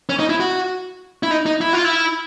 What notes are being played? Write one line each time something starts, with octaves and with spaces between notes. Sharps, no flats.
C#4
D#4
E4
F#4
E4
D#4
D#4
E4
F4
E4